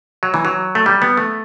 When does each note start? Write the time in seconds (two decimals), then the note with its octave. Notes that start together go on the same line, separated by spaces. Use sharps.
0.23 F#3
0.34 E3
0.45 F#3
0.75 A3
0.86 G3
1.02 B3
1.17 A3